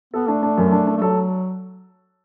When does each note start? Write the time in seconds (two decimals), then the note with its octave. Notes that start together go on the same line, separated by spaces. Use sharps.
0.14 B3 A4
0.28 A3 D4
0.43 D4
0.58 F#2
0.72 D4
0.87 D4
0.97 A3
1.02 F#3 A4